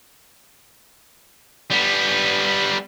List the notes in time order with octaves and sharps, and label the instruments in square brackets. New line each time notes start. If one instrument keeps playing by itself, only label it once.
[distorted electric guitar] G3 B3